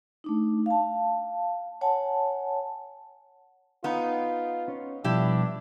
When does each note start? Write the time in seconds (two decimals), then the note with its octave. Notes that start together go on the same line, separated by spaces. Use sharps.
0.24 A3 D4 D#4
0.66 F5 A5
1.81 C#5 F#5 G#5 A5
3.84 B3 D#4 F4
4.68 C#4 C#5
5.04 B2 F3 G3 D4 E4 G4